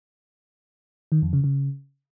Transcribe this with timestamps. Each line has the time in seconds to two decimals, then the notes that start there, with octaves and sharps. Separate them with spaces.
1.12 D#3
1.22 F2
1.33 C#3
1.44 C#3